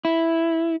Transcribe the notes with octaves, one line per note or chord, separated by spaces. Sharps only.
E4